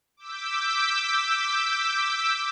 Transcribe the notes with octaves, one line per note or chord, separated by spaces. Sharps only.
D6 E6 G6 B6